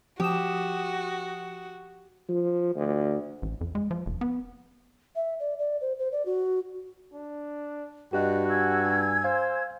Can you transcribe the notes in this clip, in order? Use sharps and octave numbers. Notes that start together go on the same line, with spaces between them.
F3 F#4 G4 D#6 E7
F3
D2
A1
F2
G#3
F3
E1
B3
E5
D5
D5
C5
C5
D5
F#4
D4
G2 F#4 G4 D#5 F#6
G#5 E6 G#6
C5 F5